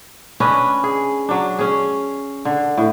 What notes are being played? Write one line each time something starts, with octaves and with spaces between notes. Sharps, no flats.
C#4 D4 B4 D#5
G#4
F#3 D4
C#4 G#4
D3
A2